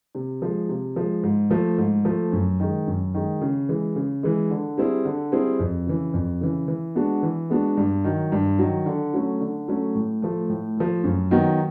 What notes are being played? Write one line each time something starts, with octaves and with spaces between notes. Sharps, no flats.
C3
F3 G#3
C3
F3 G#3
G#2
F3 A3
G#2
F3 A3
F#2
D#3 G#3
F#2
D#3 G#3
C#3
E3 G#3
C#3
E3 G#3
D3
G3 C4 E4 G#4
D3
G3 C4 E4 G#4
F2
C#3 E3
F2
C#3 E3
E3
G#3 B3 D4 F#4
E3
G#3 B3 D4 F#4
G2
D#3 F#3
G2
D#3 F#3
D3
F#3 A3 C#4
D3
F#3 A3 C#4
A2
F3 A3
A2
F3 A3
F#2
D#3 F#3 B3